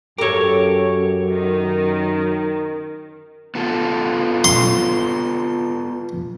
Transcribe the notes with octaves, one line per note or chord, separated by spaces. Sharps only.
F#2 G4 A4 A#4 C#5
D#3
B3 F4 A4
C6